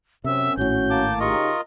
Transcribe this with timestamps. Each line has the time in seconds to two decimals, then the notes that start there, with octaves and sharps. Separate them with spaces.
0.24 F#2 C3 C4 C#4 E5
0.57 G#1 A2 C#4 F#4 G6
0.90 A#3 A5 D6
1.20 C#3 D#4 F4 G4 A#4 D#5 C#6